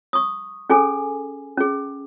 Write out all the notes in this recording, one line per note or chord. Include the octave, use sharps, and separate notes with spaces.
C#6 D#6
C#4 G#4 A4 G#5
C#4 G#4